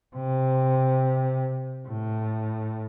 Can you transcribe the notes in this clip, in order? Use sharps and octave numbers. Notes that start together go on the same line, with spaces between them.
C3
A2